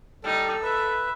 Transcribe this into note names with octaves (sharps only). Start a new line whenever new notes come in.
G3 D#4 A4
B4 E5